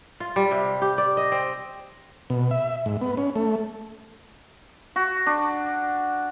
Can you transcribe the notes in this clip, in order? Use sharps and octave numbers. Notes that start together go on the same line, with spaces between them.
F4
G3
C3
G4
D5
D#5
C4
B2
E5
G#2
B3
C#4
A3
F#4
D4